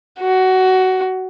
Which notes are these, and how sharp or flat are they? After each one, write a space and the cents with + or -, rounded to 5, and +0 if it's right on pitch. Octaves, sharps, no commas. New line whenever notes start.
F#4 +15